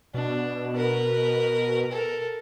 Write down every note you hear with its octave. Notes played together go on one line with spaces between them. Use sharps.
B2 D4
A#4 B4
A4 A#4